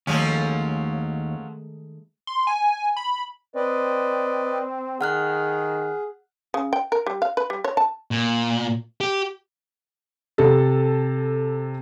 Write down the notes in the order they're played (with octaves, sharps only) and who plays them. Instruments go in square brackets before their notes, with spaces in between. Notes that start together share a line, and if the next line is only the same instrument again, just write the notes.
[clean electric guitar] D#2 [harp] D#3 G#3 A3 [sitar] F3 F#3 C#4
[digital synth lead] C6
G#5
B5
[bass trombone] C4 [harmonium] B4 D5 D#5
[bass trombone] D#3 [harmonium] G#4 [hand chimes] F#5 F6 F#6
[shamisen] C#3
G5
A#4
G3
F5
B4
G3
C#5
A5
[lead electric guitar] A#2
G4
[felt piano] C3 A4